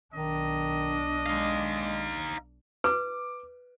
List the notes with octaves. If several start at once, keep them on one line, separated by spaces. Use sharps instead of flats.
B1 D#3 D4 D#5
G#3 D#4 F5
B4 D6